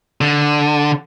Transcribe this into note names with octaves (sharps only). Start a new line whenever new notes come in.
D3